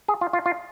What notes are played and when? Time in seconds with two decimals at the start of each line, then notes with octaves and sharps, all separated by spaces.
0.08 G#4
0.21 F4
0.33 F4
0.46 F4